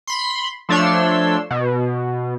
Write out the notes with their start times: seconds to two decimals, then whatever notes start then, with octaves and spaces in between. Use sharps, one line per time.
0.07 B5 C6
0.69 F3 A3 D4 C#5 C6 E6
1.51 B2